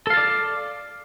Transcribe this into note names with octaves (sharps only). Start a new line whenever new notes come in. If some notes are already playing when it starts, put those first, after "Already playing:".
A4 D5 F5 A5